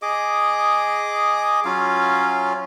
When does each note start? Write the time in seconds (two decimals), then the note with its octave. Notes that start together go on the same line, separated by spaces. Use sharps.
0.02 G#4 D#5 D6
1.65 F#3 C#4 F4 F5